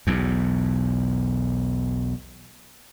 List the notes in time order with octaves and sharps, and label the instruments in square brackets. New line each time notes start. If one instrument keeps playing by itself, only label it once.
[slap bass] B1 E2